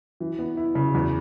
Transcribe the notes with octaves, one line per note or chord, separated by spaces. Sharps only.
E3
B3
E4
C#3
E2